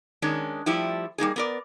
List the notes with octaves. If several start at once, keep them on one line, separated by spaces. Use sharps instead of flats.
D#3 G#3 C#4 D4
F3 G3 A3 E4 G4
G3 A#3 D#4 G#4
B3 A#4 D5